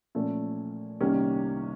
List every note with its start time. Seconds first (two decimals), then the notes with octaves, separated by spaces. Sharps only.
0.15 A#2 F3 A3 C#4
1.00 C2 C3 D#3 A#3 C#4